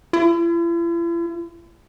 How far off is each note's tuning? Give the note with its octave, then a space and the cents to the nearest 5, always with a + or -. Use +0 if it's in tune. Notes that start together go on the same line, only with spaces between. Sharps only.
E4 +45